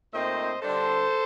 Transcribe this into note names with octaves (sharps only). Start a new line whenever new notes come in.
A#2 A3 C4 D#4 C5 D#5
D3 G3 D4 A4 C5